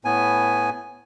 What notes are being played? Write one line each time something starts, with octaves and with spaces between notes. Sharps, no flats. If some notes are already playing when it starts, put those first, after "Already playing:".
A2 B3 G#5